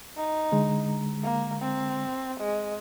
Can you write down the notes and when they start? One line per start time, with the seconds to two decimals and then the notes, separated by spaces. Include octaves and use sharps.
0.16 D#4
0.52 D3 G#3
1.23 A#3
1.62 C4
2.39 G#3